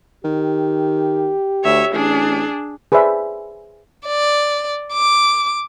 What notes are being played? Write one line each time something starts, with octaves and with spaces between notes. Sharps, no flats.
D#3 G4
D2 C#5 E5
A1 D4 G#4
G#4 B4 C5 D5 E5
D5
D6